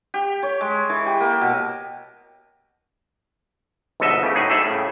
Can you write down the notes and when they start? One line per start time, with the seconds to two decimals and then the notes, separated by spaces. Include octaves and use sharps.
0.14 G4
0.43 C#5
0.61 G#3
0.89 E3
1.06 G4
1.21 A#3
1.41 B2
4.00 G1 G#2 B2 A4 D#5 E5
4.23 C#3 A3 G4
4.35 A2 D#4 F#4 G#4
4.50 G#2 G3 G#4 A4 D5 E5
4.66 A2 C#3